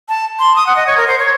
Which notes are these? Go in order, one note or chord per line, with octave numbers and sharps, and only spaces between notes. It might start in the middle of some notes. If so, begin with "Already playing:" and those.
A5
C6
D#6
F#5
D#5
C#5
A#4
C5
C#5